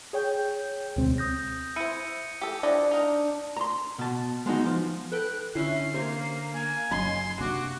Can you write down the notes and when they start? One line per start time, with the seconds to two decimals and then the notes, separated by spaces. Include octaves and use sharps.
0.13 G#4 C#5 G5 G6
0.96 D2 B2 G#3 C4
1.18 D#6 G6 A#6
1.76 E4 C5 C#7 D#7
2.41 G4 A4
2.63 F3 D4 E4 D#5
2.91 D#4 A#4
3.57 A#5 C6
3.98 B2 A5
4.46 G#3 B3 D#4 F#4
4.65 F3
5.12 A4 B4 G5 F#6
5.55 D3 C#4 E4 E5 C7
5.94 C3 A#3 C5 G#6
6.54 A#3 G#5
6.91 F#1 F#2 A#2 F#3 C#4 D#4 C6
7.40 C3 A#3 D4 F#4 D6